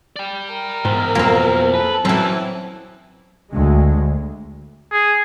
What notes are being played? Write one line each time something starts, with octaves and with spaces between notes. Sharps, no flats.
D5 G5
A#4
E2 G#2
B1 F2 A#3 C4 A#5
A4 B4
F#2 E3 F#3 C4
D2 G#3
G#4